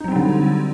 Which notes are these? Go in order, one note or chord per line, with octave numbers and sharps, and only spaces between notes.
D3 F#3 G3 C4 D#4